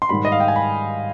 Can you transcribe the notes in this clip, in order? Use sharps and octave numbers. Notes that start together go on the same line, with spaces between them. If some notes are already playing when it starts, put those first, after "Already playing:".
C6
G#2 D#3 G3 B5
D#5
F5
G5
G#5
B5